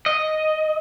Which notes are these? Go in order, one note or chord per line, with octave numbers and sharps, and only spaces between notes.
D#5